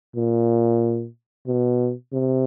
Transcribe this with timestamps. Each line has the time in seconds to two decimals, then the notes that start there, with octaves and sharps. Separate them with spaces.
0.16 A#2
1.47 B2
2.13 C3